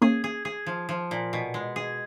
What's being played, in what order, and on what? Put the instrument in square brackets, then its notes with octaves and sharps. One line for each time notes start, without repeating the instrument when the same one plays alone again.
[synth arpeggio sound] A#3 C#4 [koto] G#4
[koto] G#4
G#4
F3
F3
A#2
B2
G#3
G#4